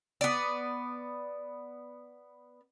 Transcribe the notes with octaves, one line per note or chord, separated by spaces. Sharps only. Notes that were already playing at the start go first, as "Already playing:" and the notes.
B3 D5